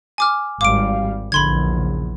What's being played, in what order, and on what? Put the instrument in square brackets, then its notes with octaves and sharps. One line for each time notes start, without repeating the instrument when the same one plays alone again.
[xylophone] G#5 D6 F6
[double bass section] G#1 G3 [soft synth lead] F5 [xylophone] D6 D7
[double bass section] A#1 E2 [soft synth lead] D3 [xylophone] B5 C6 G#6
[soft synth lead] C#3